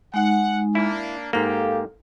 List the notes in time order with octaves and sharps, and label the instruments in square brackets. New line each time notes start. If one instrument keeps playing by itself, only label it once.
[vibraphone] G#3 D#4 [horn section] F#5
[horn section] A#3 D4 [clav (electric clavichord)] E4
[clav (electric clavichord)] G#2 A#3 [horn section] G4 [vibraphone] A4 F5